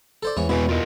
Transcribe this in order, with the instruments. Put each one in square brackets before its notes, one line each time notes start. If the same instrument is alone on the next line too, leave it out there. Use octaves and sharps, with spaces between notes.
[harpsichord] A4 C5 D5
[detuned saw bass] E2 [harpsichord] G#2 E3 C#5
[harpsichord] B2 E4 [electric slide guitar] G#3 B4 G#5
[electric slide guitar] F4 A#4 D#5